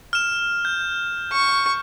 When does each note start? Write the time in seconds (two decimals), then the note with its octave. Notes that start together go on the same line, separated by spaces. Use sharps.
0.13 F6 E7
0.65 G6
1.32 C#6